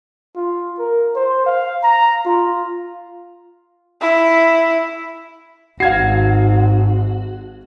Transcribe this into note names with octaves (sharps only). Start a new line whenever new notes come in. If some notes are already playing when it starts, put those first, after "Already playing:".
F4
A#4
C5
F5
A#5
F4
E4
G#1 G#2 F#4 F5 G#6 C7